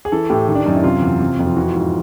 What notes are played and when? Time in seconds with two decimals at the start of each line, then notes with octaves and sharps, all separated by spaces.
0.05 G#4
0.12 E3 A4
0.30 A2 G4
0.48 D#3
0.55 D4
0.65 F#2 D#4
0.74 E4
0.84 C3 F4
1.02 E2
1.20 C3
1.39 F2
1.47 F4
1.56 E3 F#4
1.68 F4
1.75 G#2 F#4